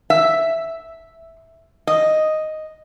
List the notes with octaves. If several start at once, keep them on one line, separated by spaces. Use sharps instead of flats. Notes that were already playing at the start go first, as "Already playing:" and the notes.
E5
D#5